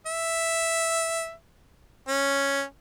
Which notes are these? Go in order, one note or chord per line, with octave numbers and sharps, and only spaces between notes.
E5
C#4